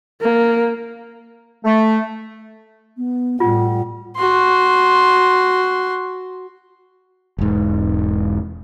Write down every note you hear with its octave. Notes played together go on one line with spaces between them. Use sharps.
A#3
A3
B3
A2 G3 F4 F#5
F#4 C6
E1 G#2